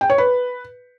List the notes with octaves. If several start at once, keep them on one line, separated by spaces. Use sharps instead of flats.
G5
C#5
B4